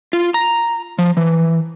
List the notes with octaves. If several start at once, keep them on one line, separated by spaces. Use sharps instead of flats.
F4
A#5
F3
E3